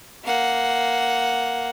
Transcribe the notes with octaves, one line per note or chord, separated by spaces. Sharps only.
A#3 F#5